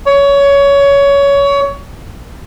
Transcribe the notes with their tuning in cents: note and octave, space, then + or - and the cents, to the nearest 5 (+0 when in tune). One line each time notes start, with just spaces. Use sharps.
C#5 +20